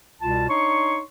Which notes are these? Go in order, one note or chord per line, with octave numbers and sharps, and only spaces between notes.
C2 B2 G3 F4 A5
D4 D#4 C#5 C6 C#6